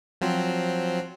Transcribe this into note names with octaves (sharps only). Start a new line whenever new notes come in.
F3 F#3 C4